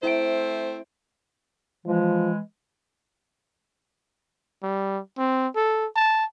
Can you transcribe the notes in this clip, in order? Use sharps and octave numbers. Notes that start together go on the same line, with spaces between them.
A3 C4 E4 C5 E5 D7
E3 F3 G#3
G3
C4
A4
A5